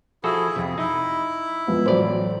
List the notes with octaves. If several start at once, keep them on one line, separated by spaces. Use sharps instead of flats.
F3 E4 F#4 G#4 A4
F2 C3
D#4 E4
F2 G#3 B3
A1 F#3 C5 D5